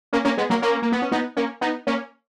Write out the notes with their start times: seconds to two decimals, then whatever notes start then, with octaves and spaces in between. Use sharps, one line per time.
0.13 A#3 C#4
0.25 A#3 C#4
0.37 G#3 B3
0.50 F#3 A#3
0.62 A#3 C#4
0.82 A#3
0.92 B3
1.02 C#4
1.12 B3 D#4
1.37 A#3 C#4
1.61 B3 D#4
1.87 A#3 C#4